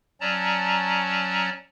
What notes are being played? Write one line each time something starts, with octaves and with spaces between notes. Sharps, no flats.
F#3 C#4 D5 A5 A#5